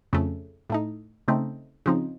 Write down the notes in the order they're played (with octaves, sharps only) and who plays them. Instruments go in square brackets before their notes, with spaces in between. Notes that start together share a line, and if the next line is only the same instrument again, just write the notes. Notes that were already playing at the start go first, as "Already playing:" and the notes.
[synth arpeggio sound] F2 C#3 A3
A2 A3 D#4
C#3 A3 C4 D#4
C#3 F3 C4 D#4